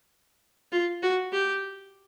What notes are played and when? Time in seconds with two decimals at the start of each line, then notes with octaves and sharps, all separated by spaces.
0.72 F4
1.03 F#4
1.32 G4